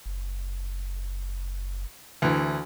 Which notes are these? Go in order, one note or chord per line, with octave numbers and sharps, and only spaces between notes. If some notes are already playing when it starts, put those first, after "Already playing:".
F#1
D2 E3